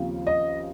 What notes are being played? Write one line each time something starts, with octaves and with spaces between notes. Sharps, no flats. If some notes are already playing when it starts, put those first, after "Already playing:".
Already playing: D#2 C#3 F3 C4
D#5